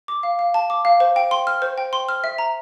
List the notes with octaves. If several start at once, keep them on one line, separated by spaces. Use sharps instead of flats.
D6
F5
F5
A5
D6
F5
C5
G5
C6
F6
C5
G5
C6
F6
E5
A#5